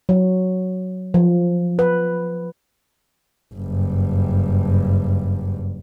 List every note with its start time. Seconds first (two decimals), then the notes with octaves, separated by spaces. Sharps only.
0.09 F#3
1.14 F3
1.79 B4
3.54 F#1 G2